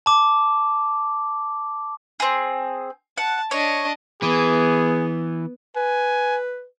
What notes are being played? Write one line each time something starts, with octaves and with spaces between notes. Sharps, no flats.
A5 D6
C4 G#4
F#5 A5
D4 C#5 D#5 C#6
E3 B3 G#4
B4 G#5